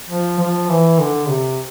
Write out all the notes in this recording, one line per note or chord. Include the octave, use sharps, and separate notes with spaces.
F3
F3
E3
D3
C3